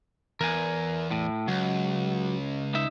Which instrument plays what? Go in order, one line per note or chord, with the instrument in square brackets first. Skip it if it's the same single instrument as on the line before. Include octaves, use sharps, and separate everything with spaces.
[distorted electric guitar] E2 [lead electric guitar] A#4 G#5
[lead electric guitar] A2
[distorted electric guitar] C#2 [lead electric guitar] F#3
[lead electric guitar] D#4 E5